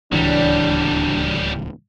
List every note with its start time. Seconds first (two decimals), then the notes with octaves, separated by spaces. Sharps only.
0.12 D1 C#2 E3 F#3 G3 D4